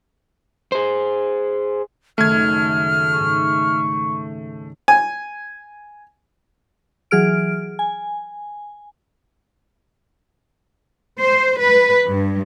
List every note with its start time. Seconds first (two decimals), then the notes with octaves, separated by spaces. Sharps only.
0.72 G#4 C5
2.18 C#2 F#2 D#3 A3 F6 G#6
3.14 G#2 G#4 C#6
4.88 G#5
7.11 E3 F#3 G#4 F6 D7
7.79 G#5
11.20 C5
11.58 B4
12.06 G2